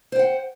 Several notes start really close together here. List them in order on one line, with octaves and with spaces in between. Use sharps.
C5 G5 F#5